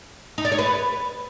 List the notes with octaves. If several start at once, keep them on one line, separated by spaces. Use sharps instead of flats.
D#4
D5
C#5
B4